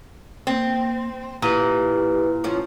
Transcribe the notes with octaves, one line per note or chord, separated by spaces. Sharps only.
A#3 C4
A#2 E3 G4
F3 C#4